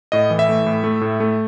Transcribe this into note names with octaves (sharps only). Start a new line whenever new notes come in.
A2 D#5
E3
E5
A3
A2
A3
A2
A3